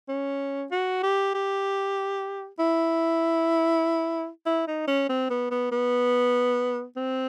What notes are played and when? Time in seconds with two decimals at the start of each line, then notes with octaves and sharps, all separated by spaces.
0.09 C#4
0.72 F#4
1.03 G4
1.34 G4
2.59 E4
4.46 E4
4.68 D#4
4.88 C#4
5.09 C4
5.30 B3
5.51 B3
5.71 B3
6.97 C4